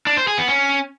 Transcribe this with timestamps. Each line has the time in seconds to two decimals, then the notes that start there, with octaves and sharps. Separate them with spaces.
0.07 D4
0.17 C5
0.27 G#4
0.38 B3
0.48 C#4